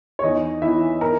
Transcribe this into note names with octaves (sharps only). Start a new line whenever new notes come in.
C#5
E2 D#4 D#5
E3 E4 E5
A#4 A#5